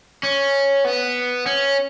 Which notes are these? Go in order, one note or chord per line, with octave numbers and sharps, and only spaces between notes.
C#4
B3
C#4